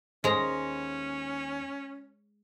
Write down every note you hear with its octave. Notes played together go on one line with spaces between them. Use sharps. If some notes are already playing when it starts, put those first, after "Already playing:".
D#2 G#3 C#4 C5 A#5